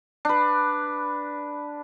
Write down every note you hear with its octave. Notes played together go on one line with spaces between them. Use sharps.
D4 B4